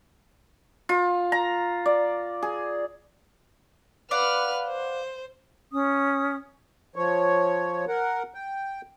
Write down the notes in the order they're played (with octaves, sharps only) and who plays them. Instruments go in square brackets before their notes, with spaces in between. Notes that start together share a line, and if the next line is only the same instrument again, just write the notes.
[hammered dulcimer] F4
A#5
D5
G#4
[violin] B4 F6 [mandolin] D5 F5 F#5
[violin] C5
[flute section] C#4 D#6
[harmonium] F3 C#5
A#4 F#5
G5